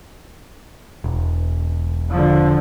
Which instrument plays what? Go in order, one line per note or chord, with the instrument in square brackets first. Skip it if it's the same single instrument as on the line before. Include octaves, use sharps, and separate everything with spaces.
[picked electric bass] E1
[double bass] D3 F3